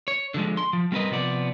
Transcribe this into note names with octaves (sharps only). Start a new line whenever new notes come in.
C#5
D3 F3 G#3
C6
F3
G3 C4 A#4 B4 D#5
C3 F3 B3 D5